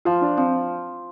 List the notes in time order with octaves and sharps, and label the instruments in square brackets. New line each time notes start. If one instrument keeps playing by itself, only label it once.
[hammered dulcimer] F3 [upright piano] F4
[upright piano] D4
[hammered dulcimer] F3 [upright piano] C4